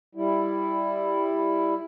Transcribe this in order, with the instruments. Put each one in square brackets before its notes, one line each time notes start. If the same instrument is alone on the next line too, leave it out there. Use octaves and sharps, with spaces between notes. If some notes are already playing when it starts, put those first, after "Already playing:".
[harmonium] G3 E4